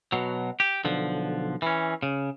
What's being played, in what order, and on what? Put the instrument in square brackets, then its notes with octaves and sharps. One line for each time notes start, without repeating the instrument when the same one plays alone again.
[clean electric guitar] B2 F#3
G4
B1 D3 F3
E3 C#4
C#3